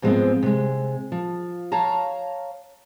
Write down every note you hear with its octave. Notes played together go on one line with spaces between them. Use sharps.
G#2 F3 G3 G#3 B3 C4
C3 G#3
F3
C#5 F5 A5 A#5